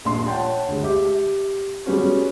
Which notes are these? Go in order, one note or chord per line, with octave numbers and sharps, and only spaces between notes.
D#1 A#1 D4 C6
C#5 F#5 G5 A5
D2 G#3
G4 E5 D6
G3 G#3 B3 C#4 F#4